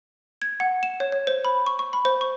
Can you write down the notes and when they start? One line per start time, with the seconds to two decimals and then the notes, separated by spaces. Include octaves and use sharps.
0.42 G#6
0.60 F#5
0.83 E7
1.00 C#5
1.12 C#5
1.27 C5
1.45 B5
1.66 C#6
1.79 C#6
1.93 B5
2.05 C5
2.21 C#6